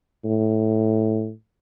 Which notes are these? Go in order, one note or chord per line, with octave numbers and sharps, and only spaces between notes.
A2